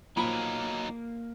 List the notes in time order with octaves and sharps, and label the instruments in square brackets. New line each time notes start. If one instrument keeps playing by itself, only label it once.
[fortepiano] A#2 F3 B5 [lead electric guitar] F#3 D#4 [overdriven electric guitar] A#3